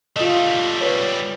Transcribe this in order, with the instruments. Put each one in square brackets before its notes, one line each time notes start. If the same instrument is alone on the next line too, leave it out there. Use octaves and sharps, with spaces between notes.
[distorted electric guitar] G3 A3 [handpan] F4 D#5
[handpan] B4 C#5